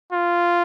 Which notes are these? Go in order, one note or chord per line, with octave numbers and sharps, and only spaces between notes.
F4